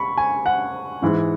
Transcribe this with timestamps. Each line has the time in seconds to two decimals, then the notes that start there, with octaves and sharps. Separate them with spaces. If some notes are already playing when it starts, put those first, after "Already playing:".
Already playing: B5 C#6
0.18 G#5
0.46 F#5
1.02 G#2 E3 G#3